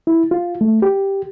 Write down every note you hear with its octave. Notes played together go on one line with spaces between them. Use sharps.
E4
F4
A3
G4